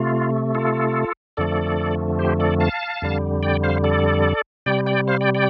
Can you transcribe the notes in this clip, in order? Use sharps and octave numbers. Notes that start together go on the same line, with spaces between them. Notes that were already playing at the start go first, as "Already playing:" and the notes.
Already playing: C3 A3 F4
F4 A4
F2 D3 F3 A3 A4 D5
G4 C5
A4 D5
F5 A5
F2 D3 G3
D5 G5
C5 F5
A4 D5
C3 G3 D5 G5
D5 G5
C5 F5
D5 G5
D5 G5